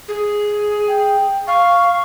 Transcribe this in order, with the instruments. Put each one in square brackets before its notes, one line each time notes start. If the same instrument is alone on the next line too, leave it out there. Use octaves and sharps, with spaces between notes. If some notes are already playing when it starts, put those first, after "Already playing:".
[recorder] G#4
[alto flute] G5
[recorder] F5 [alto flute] C#6